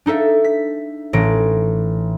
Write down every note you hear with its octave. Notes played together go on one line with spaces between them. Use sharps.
D4 D#4 A4 E5
B6
A1 A2 A#6 D7